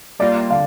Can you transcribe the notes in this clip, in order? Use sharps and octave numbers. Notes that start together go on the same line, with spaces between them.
G3 A#3 F4 D5
D3 F5